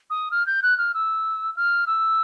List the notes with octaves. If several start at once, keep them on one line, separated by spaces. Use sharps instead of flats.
D#6
F6
G6
F#6
F6
E6
F6
E6